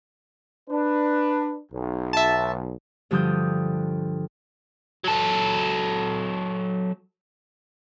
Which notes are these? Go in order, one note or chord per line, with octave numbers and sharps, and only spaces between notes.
D4 B4
B1
E5 A5
G2 D3 F3 G4 D#6 G6
F#3 A4